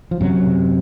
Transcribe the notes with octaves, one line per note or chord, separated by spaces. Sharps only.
F3
F#2 C3 F#3
C3